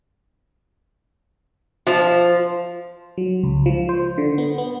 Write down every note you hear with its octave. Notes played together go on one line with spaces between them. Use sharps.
F3
F#3
C#2
F3
C5
D3
B3
B3